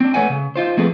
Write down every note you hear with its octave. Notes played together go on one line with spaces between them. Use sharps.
C4 D4
A3 A4 B4 C#5 F#5 G#5
C#3
D#4 F4 C5
F3 A3 C4 G#4 A4 B4